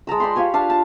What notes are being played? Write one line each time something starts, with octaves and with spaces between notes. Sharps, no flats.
G#3 A5 A#5 E6
D5 G5 B5 C6
F4 G4 C#5 G#5
D4 F5 A5
A5